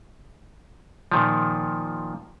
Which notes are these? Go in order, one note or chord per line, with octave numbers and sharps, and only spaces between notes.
A#2 D#3 F3